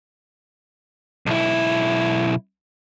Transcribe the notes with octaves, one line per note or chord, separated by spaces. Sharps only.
B1 E4